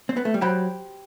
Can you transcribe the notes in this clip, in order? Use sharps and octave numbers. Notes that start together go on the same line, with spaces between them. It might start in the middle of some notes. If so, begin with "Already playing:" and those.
C4
B3
A3
G3
F#3 G4 C5 G5 B5